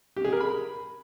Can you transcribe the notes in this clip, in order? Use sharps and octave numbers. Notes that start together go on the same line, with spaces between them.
G4
G#4
A#4
B5